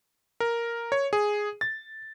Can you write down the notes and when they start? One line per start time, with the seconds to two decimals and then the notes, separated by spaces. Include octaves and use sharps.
0.40 A#4
0.92 C#5
1.13 G#4
1.61 A6